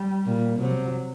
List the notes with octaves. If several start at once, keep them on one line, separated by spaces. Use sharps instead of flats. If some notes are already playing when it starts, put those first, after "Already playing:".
Already playing: G3
A#2
C3 F#3